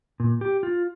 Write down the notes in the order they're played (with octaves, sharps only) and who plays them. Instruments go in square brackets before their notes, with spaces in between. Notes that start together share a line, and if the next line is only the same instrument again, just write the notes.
[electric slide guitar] A#2
G4
F4